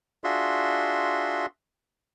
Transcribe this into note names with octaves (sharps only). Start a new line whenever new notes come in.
D4 F4 F#4 G#4 E5 C6